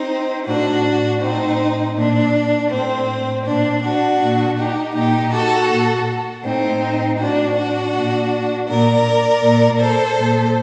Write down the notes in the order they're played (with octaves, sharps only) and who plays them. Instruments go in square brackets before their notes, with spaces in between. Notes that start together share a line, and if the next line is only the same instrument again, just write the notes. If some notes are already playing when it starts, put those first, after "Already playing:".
Already playing: [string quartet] C4 D#4
A2 D4 F#4
A2 C4 D#4
A#2 D4
A2 C4
A#2 D4
D4 F#4
A#2
D#4 G4
A#2 D#4 G4
F#4 A4
A#2
A2 C4 D#4
A2 D4 F#4
D4 F#4
A#2
A#2 A#4 D5
A#2
A4 C5
A#2